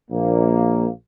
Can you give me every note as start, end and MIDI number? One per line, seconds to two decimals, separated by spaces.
0.11 0.88 34
0.11 0.88 58